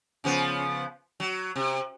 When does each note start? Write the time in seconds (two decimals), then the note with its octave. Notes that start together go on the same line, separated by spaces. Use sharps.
0.24 C#3 F3 B3
1.20 F#3
1.56 C3